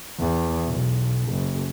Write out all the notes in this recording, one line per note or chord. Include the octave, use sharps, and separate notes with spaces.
E2
B1
F#1